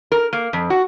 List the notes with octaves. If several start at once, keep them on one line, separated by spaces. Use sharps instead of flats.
A#4
A#3
F2
F#4